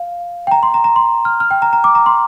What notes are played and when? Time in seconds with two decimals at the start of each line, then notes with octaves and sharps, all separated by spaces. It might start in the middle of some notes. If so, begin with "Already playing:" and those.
Already playing: F5
0.47 G5
0.51 A#5
0.63 C6
0.74 A#5
0.84 A#5
0.96 C6
1.25 F6
1.40 F6
1.51 G5
1.62 A#5
1.73 A#5
1.84 D6
1.95 A#5
2.06 C6